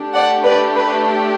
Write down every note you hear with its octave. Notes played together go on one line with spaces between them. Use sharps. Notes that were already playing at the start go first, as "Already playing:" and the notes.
Already playing: A3 D4 G4
D5 F#5
B4 D5
B4